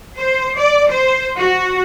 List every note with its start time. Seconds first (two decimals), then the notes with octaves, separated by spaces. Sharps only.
0.17 C5
0.56 D5
0.89 C5
1.38 F#4